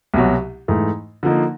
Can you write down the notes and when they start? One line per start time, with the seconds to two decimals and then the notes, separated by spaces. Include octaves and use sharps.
0.14 C2 B2 F#3
0.68 G#2 E3 A3
1.23 D3 F3 A#3 D#4